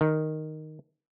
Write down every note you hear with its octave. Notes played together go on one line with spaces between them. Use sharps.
D#3